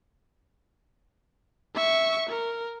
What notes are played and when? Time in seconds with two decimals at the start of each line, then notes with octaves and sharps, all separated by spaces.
1.75 E5 C#6
2.29 A#4